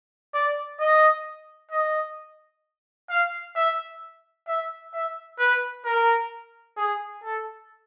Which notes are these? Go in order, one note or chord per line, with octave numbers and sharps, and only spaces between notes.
D5
D#5
D#5
F5
E5
E5
E5
B4
A#4
G#4
A4